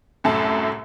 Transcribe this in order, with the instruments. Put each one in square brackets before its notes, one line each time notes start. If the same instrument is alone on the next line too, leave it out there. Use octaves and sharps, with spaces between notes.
[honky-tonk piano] C2 F#2 A2 A5